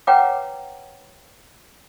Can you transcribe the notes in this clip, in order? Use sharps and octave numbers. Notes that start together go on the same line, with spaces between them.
B4 C#5 F#5 G5 A#5 D6